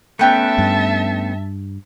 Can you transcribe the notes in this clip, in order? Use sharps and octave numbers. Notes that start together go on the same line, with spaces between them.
A3 B3 C#4 E5 G5 A5 F#6
G2